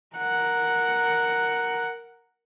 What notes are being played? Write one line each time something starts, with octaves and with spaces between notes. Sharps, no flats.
A#4 F#5